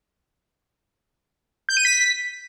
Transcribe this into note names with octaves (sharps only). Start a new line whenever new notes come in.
G6
D#7
B6